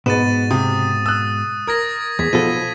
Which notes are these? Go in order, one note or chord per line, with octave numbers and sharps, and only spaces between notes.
G#2 B2 B3 A6 D#7 E7
C3 D#6
D#6 E6 F#6
A#4 D#6 G#6 A#6
E2 G#6 B6
B1 B2 F3 A4 D#7